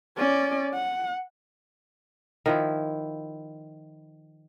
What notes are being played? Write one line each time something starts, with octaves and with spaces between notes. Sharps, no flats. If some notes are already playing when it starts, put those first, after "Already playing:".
C#4 D5
F#5
D#3 F3 E4